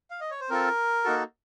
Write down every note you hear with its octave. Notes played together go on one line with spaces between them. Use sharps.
F5
D#5
C#5
C5
C4 F4 A4 A#4
A#3 D#4 F#4 A4